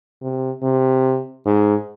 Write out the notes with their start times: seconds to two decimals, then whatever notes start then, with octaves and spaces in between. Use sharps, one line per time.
0.22 C3
0.63 C3
1.46 G#2